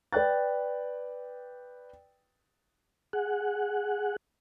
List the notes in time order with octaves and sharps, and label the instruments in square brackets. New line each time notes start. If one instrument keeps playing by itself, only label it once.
[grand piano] B4 D5 G5 F#6 A6
[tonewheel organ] G#4 F#5